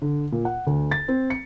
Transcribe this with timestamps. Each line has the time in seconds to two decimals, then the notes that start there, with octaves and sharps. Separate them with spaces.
0.02 D3
0.32 A#2
0.45 F#5
0.67 D2
0.91 A6
1.08 C4
1.30 C#7